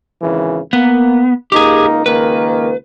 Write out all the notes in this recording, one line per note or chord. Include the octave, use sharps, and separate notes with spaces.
G#1 C#3 E3
A#3 B3
C#2 A#3 D#4 G4 G#4
C#2 D#3 A#3 B4